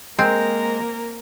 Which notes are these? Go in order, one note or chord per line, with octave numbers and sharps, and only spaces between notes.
G#3 A#3 C4 A#4